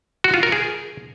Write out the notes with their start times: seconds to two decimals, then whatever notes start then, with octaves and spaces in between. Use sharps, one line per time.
0.24 F#4
0.34 F4
0.43 A#4
0.52 G#4